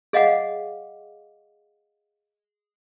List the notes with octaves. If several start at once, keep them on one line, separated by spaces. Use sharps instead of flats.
G#4 D#5 F5 F#5 D6